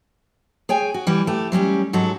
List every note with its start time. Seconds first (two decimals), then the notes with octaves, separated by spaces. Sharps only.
0.69 G#4 C#5 G5 G#5
0.94 F#4
1.07 E3 G3
1.27 A3 G4
1.52 F#3 G3 C#4 G4
1.93 G#2 F#3 F#4 A4